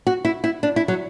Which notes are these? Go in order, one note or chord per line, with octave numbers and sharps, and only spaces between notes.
F#4
E4
E4
D4
E4
F#3